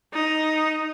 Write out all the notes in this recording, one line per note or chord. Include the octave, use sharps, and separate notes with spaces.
D#4